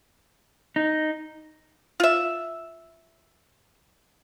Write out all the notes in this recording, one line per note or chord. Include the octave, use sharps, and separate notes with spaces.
D#4
F4 E5